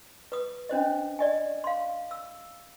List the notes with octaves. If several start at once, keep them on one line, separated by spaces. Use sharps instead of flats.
B4 D#6
C#4 D4 C5 D#5
D5 D#5 G#5
F5 C6
E6